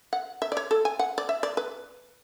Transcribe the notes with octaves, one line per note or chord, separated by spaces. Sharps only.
F#5
E5
D5
C#5
A4
G#5
F#5
D5
E5
D5
B4